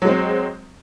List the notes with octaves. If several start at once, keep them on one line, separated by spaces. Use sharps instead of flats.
F#3 G#3 C4